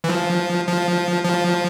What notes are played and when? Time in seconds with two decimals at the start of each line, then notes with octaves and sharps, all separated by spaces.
0.04 E3
0.10 F3
0.68 F3
1.24 F3